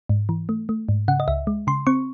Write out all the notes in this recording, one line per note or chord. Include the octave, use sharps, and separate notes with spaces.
G#2
E3
A3
A3
G#2
C#3 F#5
D#5
C#2 E5
G#3
C#3 C6
C4 C#6